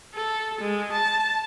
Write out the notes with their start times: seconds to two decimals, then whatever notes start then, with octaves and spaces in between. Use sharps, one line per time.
0.14 A4
0.61 G#3
0.92 A5